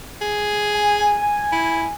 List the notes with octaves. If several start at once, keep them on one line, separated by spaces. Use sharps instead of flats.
G#4
G#5
E4